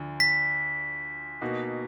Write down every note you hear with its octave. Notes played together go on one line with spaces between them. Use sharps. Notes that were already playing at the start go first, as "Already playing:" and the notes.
Already playing: D2 D3 F3
B6
B2 A#3 D#4 F#4